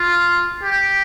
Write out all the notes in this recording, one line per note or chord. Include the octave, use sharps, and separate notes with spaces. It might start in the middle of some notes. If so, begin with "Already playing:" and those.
Already playing: F4
G4